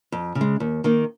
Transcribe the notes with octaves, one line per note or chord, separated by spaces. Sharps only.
F2
C#3
G#3
D#2
D#3 A#3 D#4